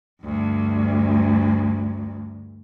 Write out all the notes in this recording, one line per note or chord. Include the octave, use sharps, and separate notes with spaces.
D2 G2